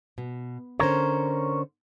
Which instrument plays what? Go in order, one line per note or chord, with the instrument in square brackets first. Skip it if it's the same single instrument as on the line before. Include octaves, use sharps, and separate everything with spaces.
[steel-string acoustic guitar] B2
[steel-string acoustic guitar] D3 C#4 C5 [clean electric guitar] A#4 C#5